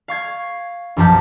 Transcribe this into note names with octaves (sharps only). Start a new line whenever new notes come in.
F5 C#6 G#6
B1 F#2 F3 G4 A5 G6